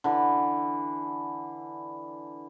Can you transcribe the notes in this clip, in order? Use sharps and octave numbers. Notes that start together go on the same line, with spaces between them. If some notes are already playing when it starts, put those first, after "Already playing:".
D3 E3